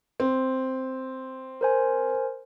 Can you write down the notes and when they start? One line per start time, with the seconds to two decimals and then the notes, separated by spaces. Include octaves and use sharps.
0.20 C4
1.61 A#4 C5 G#5